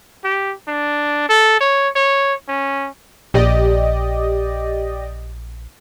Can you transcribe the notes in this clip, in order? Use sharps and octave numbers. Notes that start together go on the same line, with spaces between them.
G4
D4
A4
C#5
C#5
C#4
A#1 G4 D5 D#5